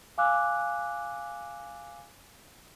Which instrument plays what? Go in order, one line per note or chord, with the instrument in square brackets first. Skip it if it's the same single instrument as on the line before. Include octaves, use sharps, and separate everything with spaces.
[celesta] F5 G#5 D6 E6 F#6